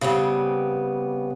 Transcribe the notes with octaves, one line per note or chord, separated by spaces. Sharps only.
C#3 G3 B3 C4